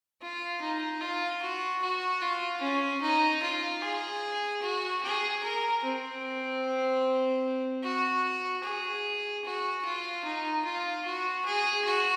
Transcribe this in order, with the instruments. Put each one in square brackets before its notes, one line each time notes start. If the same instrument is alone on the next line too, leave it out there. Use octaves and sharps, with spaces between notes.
[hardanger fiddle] F4
D#4
F4
F#4
F#4
F4
C#4
D#4
F4
G#4
F#4
G#4
A#4
C4
F#4
G#4
F#4
F4
D#4
F4
F#4
G#4
F#4